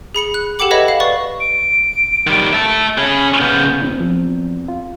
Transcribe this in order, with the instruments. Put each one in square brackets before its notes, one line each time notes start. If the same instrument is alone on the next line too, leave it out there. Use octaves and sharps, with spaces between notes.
[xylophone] G#4 B5 C#7 F#7
F#6
G4 A4 F#5 G5 D6 F#7
B4 C#5 D#5 E5 F#5 B5
F5
B4 D5 C#6
[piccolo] D7
[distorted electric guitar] D#3 G3
E5 A5
[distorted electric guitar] C#4 G#4 [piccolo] B5
[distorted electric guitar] C#3 B3 [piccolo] G6
[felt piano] E2 C4
[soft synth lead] F3
F4